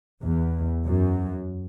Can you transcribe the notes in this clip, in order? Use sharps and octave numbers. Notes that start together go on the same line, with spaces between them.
E2
F#2